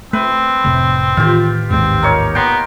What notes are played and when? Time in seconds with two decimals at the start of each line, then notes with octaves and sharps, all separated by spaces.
0.13 A3 C4 B4
0.64 F1 A2 C3
1.17 A2 D#3 E3 F4 G4
1.70 A1 D#2 G#2 C4
2.03 A#3 D#4 C#5
2.35 B3 G5 A#5 C6